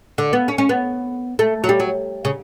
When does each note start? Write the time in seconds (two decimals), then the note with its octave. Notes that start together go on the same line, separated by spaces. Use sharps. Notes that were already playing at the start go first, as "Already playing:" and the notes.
0.18 D3
0.33 B3
0.48 C#4
0.58 C#4
0.69 B3
1.39 A3
1.64 F#3
1.69 G3
1.80 F#3
2.25 C#3